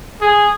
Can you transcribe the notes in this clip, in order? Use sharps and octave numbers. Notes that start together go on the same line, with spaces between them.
G#4